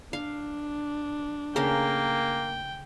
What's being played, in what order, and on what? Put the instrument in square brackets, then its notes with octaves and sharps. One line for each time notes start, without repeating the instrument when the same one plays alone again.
[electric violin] D4 [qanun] F5
[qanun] C#3 A3 A#4 [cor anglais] A#3 [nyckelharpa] G5